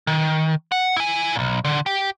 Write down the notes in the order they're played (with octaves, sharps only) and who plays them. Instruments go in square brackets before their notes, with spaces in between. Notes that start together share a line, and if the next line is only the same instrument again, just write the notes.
[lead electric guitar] D#3
F#5
E4 G#5
B1 A#2
D3
G4